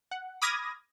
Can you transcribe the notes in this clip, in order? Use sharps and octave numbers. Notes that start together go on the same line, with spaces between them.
F#5
B5 D6 D#6 F6 G#6 A#6